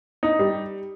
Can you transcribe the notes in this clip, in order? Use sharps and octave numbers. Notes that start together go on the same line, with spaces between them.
D#4
G3